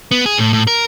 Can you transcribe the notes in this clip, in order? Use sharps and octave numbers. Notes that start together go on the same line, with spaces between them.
B3
G#4
A2
A2
A#4